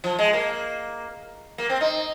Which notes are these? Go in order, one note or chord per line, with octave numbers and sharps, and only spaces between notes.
F3
G#3
A#3
A#3
C4
D#4